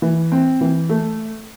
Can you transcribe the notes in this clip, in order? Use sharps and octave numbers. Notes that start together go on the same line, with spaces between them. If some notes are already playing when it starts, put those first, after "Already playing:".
E3
C4
E3
A3